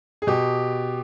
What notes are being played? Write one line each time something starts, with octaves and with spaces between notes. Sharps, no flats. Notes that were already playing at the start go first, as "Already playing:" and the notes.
G#4
B2 G4